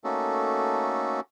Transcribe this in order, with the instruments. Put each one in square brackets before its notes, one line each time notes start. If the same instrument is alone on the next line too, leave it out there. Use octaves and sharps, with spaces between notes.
[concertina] A3 A#3 C#4 D#4 F#4 A4